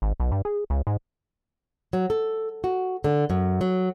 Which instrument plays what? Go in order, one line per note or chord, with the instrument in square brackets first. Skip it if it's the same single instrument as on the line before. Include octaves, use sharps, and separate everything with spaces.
[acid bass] G#1
B1
G2
G#4
C#2
G#2
[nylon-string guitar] F#3
A4
F#4
D3
F#2
F#3